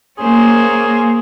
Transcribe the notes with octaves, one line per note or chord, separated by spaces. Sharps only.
A#3 C#4 G#4 C5